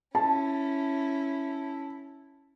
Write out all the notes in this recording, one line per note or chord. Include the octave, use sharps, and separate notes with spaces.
C#4 E4 A5